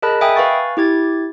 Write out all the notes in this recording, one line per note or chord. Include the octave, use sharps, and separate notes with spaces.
G#4 A#4 D#5 A5 B5 F#6
E5 G5 G#5 B5 D#6
B4 F5 G#5 C#6 A6
E4 G4 G#6 A6